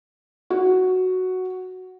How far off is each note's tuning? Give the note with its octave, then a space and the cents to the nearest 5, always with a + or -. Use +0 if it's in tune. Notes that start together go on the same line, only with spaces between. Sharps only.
F#4 +0